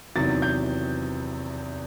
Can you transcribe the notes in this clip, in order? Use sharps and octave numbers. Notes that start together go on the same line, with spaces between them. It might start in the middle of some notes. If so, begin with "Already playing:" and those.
E2 C3 D#3 F#3 A6
G6